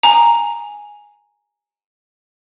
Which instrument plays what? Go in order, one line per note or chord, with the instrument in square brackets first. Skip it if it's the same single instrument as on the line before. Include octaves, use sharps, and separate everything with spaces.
[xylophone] G#5 A#5